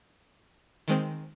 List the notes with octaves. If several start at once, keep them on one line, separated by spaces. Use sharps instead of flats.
D#3 G#3 C4